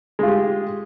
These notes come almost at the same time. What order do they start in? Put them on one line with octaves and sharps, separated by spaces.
G#3 F4 G4